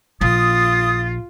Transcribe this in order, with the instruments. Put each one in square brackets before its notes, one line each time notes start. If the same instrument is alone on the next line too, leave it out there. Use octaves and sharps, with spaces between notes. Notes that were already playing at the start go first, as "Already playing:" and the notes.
[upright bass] A#1 [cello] F4 [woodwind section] D#6 [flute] A6